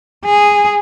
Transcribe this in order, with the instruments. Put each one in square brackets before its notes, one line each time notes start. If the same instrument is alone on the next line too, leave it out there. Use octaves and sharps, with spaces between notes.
[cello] G#4